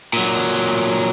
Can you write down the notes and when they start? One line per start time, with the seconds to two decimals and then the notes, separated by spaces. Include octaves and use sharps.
0.13 A#2 F#3